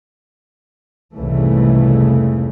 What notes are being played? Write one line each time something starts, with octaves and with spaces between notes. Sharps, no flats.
C2 F2 G#2 C#3 E3 A3